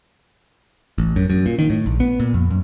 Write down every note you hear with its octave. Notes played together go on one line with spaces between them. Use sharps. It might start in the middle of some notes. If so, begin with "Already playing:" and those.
A1
F#2
F#2
A#2
D#3
A2
A#1
B3
A#2
F2
F#2